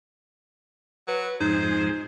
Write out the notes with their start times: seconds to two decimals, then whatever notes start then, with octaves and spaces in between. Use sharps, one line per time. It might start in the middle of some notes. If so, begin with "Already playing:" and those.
1.08 F#3 B4
1.40 F2 G#2 D#4 G#4 C5